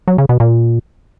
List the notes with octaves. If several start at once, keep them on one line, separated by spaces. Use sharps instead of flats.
F#3
C#3
B2
A#2